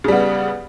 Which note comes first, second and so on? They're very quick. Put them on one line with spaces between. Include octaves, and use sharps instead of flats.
C#3 G3 B3